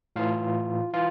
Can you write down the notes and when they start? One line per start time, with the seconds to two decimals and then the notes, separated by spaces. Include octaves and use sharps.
0.16 A2 E3 F4 F5
0.94 E3 F4 F5